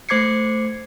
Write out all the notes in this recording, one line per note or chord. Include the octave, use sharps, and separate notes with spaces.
A3 C5 D6 G#6 C7 C#7